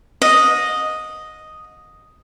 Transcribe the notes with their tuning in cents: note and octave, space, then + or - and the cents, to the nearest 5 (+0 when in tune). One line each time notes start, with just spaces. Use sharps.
D#5 +0 F#5 -45